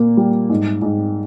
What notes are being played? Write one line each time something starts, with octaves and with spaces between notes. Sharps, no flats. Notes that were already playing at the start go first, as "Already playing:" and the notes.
Already playing: A#2 A#3
G3
G#2
G#2